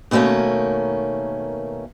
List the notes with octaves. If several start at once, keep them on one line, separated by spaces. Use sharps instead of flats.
B2 D#3 A3 A#3 C#4